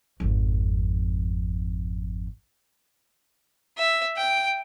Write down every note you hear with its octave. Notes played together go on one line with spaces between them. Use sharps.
G#1 F2
E5
G5